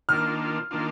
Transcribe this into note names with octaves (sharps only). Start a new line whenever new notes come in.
D#3 A#3 D4 F4 F6
D#3 A#3 D4 F4